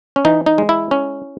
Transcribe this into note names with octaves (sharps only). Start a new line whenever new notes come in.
C#4
E3 D#4
D#4
G#3
E4
C#4